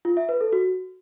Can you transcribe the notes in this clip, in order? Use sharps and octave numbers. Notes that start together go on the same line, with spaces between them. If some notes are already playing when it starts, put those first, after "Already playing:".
F4
E5
B4
A4
F#4